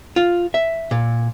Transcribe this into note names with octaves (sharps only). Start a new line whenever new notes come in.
F4
E5
A#2